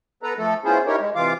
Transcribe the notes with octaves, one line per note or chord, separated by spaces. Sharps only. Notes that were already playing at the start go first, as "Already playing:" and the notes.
B3 A4 B4 A#5
F3 A3 A4
B3 C#4 E4 F4 G#4 C5
D#4 E4 G4 A#4 C#5
G#3
C3 E3 F4 F5 D6